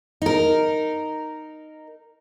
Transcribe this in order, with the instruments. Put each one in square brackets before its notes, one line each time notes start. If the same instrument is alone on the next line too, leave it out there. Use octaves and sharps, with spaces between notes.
[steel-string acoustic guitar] D#4 A#4